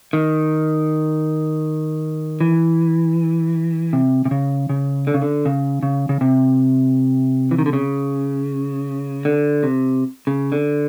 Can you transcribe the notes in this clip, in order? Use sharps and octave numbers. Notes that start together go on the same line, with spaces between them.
D#3
E3
C3
C3
C#3
C#3
D3
C#3
D3
C#3
C#3
C#3
C3
E3
D#3
D3
C#3
D3
C3
C#3
D3